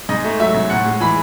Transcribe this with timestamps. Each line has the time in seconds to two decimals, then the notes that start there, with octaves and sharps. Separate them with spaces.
0.09 G#2 D#5
0.24 A3
0.39 F#3 E5
0.54 G#2
0.70 A2 F#5
0.86 G#3
1.00 E3 B5